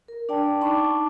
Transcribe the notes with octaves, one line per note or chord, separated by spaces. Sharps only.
A#4
D4 D5 G5 A5
D#4 A5 B5 C#6 D6